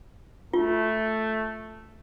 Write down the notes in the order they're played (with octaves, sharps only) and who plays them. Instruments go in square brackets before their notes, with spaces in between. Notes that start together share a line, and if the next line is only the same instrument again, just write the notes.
[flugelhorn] A3 [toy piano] F4